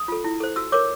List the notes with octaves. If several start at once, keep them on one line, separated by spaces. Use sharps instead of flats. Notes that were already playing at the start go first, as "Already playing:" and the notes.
Already playing: D#6
F4 A4
E4
A4 C5
F#4 E6
A#4 C#5 D6